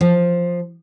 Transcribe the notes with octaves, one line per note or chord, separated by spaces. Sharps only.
F3